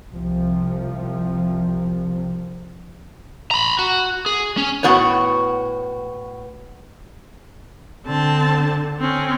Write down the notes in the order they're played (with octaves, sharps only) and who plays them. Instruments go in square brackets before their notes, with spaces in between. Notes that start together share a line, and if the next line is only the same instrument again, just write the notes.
[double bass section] C2 C3 F3
[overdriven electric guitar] A#5 B5
F#4
G#4
C#4
[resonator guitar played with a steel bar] A2 B3 F#4 B4 C#5
[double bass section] D3 [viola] C4 A5
[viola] C4 C#4